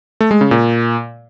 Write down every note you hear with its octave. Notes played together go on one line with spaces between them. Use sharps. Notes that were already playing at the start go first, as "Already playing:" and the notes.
A3
G#3
C#3
A#2